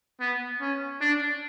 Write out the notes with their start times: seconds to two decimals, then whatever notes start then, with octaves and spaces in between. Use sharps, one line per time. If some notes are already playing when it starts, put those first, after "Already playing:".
0.20 B3
0.61 C#4
1.01 D4